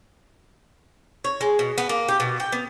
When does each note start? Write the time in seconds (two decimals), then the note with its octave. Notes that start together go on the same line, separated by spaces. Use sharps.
1.24 C#5
1.41 G#3
1.59 B2
1.78 B3
1.89 A#3
2.08 G4
2.20 B2
2.40 G5
2.52 B3